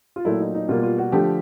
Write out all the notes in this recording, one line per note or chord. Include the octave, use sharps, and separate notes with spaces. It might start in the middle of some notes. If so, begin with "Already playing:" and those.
F4
A#2 F#3 A3 E4
D#4
D#4
B2 G3 A#3 F4
F4
F#4
D3 F3 A3 G4